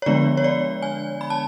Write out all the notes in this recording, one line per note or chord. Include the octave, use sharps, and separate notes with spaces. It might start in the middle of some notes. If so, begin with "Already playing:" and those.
C#5
D3 F3 G#3 B3 D4 D5
C#5
D5
G#5
B5
A5